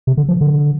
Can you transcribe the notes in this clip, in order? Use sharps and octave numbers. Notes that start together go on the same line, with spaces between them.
C3
D3
F3
D3